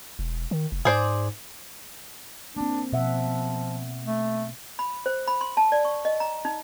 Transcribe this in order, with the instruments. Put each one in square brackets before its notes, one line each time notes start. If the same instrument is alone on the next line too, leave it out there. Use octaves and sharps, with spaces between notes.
[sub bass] E1
D#3
F1
[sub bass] G#2 [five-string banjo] G#4 C5 D5
[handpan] A#3 C4 [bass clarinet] D4
[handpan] B2 E5 F#5 [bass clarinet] F3
[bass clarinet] A3
[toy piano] B5
C5
B5
C6
A5
D5
C#6
D#5
A#5
D#4